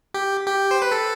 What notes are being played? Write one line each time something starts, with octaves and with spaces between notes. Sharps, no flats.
G4
G4
C5
B4
A4